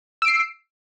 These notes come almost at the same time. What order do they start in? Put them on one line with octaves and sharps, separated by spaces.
E6 D7 C7